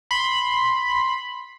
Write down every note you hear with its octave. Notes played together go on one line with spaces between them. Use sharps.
B5 C6